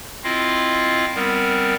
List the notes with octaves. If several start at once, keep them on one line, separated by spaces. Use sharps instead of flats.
C4 E4 F4 D#5 F5
G3 B3 C4 A#4